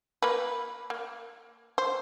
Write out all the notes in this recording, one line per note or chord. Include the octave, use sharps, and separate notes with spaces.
A#3 B4
A#3
C5